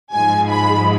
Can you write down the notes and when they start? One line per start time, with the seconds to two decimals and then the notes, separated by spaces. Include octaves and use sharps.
0.13 G#2 F3 G#3 G#5
0.50 B5